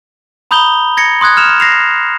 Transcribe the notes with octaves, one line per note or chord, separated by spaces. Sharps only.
A#5 B5 D#6 G6 F7 G7
G#6 A#6 C#7
C6 D#6 F#6 G#6
F6 E7 F7
A#6 C7 F7